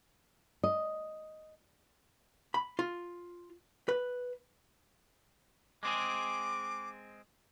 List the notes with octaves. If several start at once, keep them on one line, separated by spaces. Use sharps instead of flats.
D#5
B5
F4
B4
G#3 C4 G#4 D6